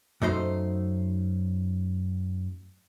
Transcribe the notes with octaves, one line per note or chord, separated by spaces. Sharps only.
F#2 A3 D#4 C5